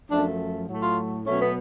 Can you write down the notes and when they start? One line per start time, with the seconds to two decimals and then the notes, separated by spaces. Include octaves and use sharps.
0.09 F#2 F3 A3 D4
0.67 A2 F#3 A3
0.82 F4
1.26 B2 F#3 A3 C#4
1.40 B3